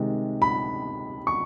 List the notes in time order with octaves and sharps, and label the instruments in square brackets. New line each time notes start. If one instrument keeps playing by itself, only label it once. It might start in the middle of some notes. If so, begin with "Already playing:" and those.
Already playing: [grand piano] C3 D#3 G#3
B5
C#6